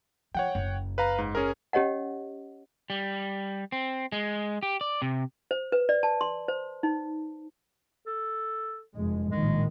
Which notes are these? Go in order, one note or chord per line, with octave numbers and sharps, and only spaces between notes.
F3 C#5 F#5 G5
F#1
B4 F5 A#5
G#2
C#4 G#4 A#4
C#4 G4 C#5 D#5 F#5
G3
C4
G#3
G4
D5
C3
C5
B4
D5
A5
C6
C5
D#4
A4
F1 F#2 G#3
A#1 A2 D#3 G#3